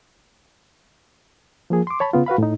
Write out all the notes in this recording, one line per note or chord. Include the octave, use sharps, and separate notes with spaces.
F3 A#3 G#4
C6 D6
C#5 A5 B5
C#3 B3 F4
F#4 B4 F5 B5
A2 D#4